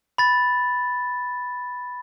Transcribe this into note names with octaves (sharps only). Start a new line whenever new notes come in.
B5 A6